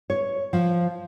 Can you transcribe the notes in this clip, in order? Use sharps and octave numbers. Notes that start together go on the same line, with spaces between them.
C#5
F3